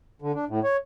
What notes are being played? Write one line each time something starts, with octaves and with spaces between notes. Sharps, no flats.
D3
D4
A2
C#5